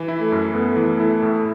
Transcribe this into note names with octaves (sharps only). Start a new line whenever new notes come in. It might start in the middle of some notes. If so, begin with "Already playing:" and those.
Already playing: E3
E4
A3
F#2
A3 B3
E3
E4
A2